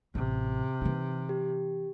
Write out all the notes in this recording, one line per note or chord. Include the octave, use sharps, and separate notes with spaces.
A1 C3
E3 D#4
G4